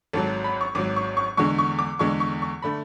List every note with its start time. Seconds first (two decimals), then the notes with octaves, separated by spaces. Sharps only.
0.13 G#1 G#2 F#3 A4
0.44 B5
0.61 C#6
0.75 G#1 G#2 F#3 D6
0.96 C#6
1.17 C#6
1.37 E2 D3 G#3 C#6
1.58 C#6
1.79 D6
1.99 E2 D3 G#3 C#6
2.20 C#6
2.42 C#6
2.62 D3 A3 B5